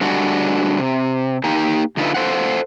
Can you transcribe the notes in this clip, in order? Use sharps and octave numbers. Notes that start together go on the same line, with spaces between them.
D3 G3 G#3 D4 F#4
C3
A#3 D#4 G4
D3 D#4 F4 A#4 B4 E5
A4 C5 F5 F#5